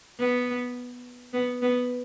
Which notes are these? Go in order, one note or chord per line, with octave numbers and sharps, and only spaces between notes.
B3
B3
B3